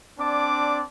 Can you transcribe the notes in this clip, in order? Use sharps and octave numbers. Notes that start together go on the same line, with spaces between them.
C4 D4 D5 A5 D6